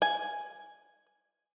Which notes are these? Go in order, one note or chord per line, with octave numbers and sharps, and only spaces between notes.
G#5